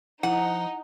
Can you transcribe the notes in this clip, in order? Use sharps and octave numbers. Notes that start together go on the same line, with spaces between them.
F3 D#4 E4 F#5